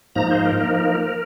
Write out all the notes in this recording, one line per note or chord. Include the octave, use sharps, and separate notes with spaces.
G#2 F3 A#3 D#4 A#5
C5
A#4
F3 A#3 D#4